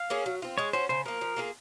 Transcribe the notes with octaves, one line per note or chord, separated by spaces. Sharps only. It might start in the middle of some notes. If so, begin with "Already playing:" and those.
Already playing: F5
A#3 C#4 G#4
F#3
C4 F4
G#3 C#5
C#4 F#4 C5
C#3 C5
F3 A#3 A#4
F3
A#3 F4 G#4